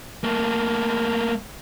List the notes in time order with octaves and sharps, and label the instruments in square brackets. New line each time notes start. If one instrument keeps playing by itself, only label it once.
[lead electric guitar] A3 A#3